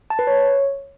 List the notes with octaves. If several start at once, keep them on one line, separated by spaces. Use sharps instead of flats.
A5
B4
C#5